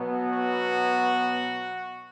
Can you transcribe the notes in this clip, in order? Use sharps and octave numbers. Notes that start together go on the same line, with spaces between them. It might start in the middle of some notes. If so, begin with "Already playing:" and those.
Already playing: B2 F#3 B3
F#4